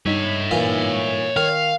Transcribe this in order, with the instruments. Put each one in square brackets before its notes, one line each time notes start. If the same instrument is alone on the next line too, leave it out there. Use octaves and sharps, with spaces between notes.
[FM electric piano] G2 D#4 B6 [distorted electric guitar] C#5 E5
[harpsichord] A#2 E3 F5
[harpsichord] D#3 [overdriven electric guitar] F5